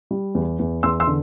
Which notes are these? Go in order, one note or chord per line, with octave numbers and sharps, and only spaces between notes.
G3
E2
E2
E2 C6 E6
C6 E6
D3